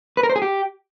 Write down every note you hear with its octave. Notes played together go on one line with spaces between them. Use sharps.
B4
A#4
C5
G#4
G4